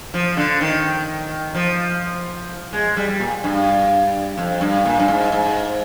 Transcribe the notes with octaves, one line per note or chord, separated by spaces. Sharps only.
F3
D3
D#3
F3
G#3
G3
G3
A#2
G2
F2
G2
A#2
G2
G#2
G#2